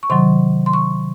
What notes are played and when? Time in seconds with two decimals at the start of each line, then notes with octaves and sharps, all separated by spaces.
0.03 C#6
0.10 C3 D#3 F#3 C6
0.66 C6
0.73 C#6